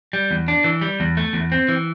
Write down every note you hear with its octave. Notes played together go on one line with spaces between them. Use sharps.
G3
E2
D4
E3
G3
E2
A3
E2
C4
E3